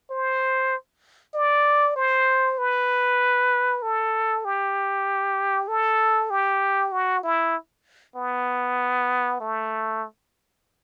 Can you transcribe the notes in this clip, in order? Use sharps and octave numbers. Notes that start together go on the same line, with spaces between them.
C5
D5
C5
B4
A4
G4
A4
G4
F#4
E4
B3
A3